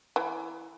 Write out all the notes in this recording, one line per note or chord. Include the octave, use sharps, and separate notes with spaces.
E3